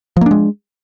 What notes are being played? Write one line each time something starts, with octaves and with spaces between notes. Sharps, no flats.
F3 G#3 A#3 D4